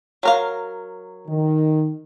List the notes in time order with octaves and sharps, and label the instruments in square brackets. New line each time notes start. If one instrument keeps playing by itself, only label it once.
[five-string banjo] F#3 A#4 F5
[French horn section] D#3